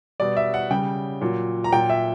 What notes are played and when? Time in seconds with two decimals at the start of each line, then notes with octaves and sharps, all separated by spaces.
0.20 B2 G3 D5
0.37 E5
0.54 F#5
0.70 C#3 G3 G5
1.21 A#2 F#3
1.64 A#5
1.72 A#2 F#3 G5
1.90 E5